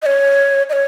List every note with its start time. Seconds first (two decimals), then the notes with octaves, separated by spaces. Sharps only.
0.02 D#5
0.06 C#5
0.69 D#5
0.73 C#5